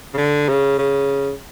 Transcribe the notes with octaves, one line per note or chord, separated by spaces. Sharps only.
C#3
D3
C#3
C#3